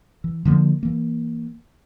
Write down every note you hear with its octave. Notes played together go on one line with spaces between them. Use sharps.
E3
D3 F3 G#3 A#3
E3 A#3